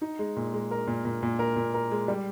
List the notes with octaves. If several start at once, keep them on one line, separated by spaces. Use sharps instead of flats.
D#4
G#3
A#2
G#3
A#4
A#2
A#2
A#2
A#4
A#2
A#4
G#3
G3